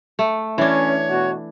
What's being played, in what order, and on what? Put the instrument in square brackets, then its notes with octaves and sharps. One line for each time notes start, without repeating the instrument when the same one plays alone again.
[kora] A3
[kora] E3 D4 [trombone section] C#4 [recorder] C#5
[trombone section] B2 F#4